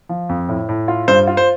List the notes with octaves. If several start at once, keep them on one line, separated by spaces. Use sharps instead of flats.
F3
F2
A2
A2
F4
G2 C5
F4
C5